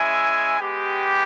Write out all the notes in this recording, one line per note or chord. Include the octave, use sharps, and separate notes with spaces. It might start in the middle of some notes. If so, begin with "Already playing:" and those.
Already playing: G#3 C#4 E4 E5 G#5
G#3 B3 G4